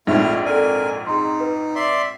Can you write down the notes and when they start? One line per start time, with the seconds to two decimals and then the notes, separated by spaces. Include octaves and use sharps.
0.07 A#1 F2 G#2 A3 E4 F4 E5 F6
0.46 A4 A#4 D5 G#5
1.07 D#4 G#4 A#5 C6
1.40 B4
1.75 D5 E5 C6